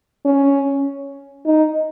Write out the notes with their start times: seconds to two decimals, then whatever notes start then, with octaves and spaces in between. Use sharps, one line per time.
0.25 C#4
1.45 D#4